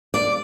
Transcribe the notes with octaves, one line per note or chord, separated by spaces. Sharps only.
D5